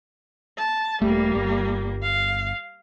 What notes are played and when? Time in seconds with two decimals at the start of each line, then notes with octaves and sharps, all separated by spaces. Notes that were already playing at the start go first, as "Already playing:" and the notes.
0.58 A5
1.02 E1 C#2 G3 A3 A#3
1.35 G1
2.02 F5